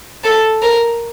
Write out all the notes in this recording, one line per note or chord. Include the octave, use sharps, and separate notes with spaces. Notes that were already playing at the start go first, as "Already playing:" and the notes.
A4
A#4